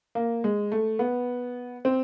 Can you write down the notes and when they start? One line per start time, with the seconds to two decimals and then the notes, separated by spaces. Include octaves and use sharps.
0.15 A#3
0.44 G#3
0.72 A3
0.99 B3
1.85 C4